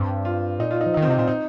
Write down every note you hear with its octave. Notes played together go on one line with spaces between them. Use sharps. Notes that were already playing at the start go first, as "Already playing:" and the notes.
Already playing: G2 C4
F4
A#2 D#4
F4
D#4
F3
D#4
D#3
C4
C3 D#4
A#2 C4
D#4